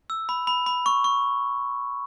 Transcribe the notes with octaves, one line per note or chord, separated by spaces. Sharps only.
E6
B5
B5
B5
C#6
C#6